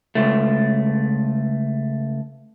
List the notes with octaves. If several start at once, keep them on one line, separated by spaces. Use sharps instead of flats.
C#2 A3